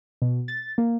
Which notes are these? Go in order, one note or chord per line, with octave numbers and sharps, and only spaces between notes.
B2
A6
A#3